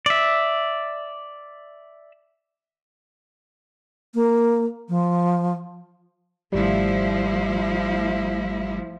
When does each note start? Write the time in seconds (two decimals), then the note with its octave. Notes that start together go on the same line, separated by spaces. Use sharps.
0.06 D5 E5
4.14 A#3
4.89 F3
6.53 G#1 F3 G3 A3 E4